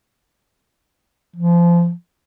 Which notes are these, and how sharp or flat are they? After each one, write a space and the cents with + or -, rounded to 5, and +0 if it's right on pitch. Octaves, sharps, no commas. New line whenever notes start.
F3 -25